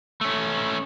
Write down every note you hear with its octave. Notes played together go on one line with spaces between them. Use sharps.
A3 C#4